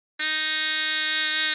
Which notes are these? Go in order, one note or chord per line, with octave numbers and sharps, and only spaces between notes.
D#4